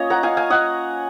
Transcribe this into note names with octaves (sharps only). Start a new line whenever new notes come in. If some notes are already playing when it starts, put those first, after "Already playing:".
Already playing: A#3 C#4 F4 C#5 D#5
F#5 A#5
F5 G#5
F5 G#5
D#5 F#5